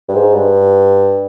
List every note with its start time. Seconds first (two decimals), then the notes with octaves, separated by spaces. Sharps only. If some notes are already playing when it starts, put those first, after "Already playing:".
0.08 G2
0.14 G#2
0.34 G2